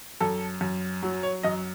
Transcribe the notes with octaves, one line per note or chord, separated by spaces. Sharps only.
F#2 A4
F#2
F#3
C#5
F#2 D#5